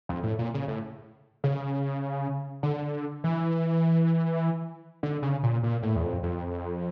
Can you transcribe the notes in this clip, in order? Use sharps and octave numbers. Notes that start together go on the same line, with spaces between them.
F2
A2
A#2
C#3
A2
C#3
D3
E3
D3
C#3
A#2
A#2
A2
E2
F2
F2